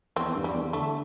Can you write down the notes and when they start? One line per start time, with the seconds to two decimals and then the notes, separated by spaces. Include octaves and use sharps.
0.16 E2 C4
0.27 E2
0.35 G2
0.44 G3
0.54 E2
0.73 D3 A3